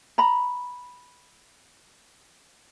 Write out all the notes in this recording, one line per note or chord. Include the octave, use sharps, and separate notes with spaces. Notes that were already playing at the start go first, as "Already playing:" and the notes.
A#5 B5